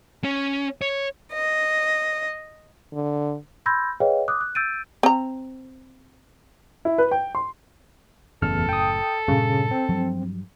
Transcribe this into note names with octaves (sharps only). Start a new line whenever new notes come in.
C#4
C#5
D#5
D3
B5 C6 E6 G6 G#6 A#6
G#4 B4 C#5 D#5 F5 G5
D6 D#6 F#6
F#6
E6 G6 A6 D7 D#7
C4 A#5
E4
B4
G5
C6
F#1 E2 A2 C#4 A4 F6
G5 D#6
G2 A#2 C#3
C4
G2 F3 F#3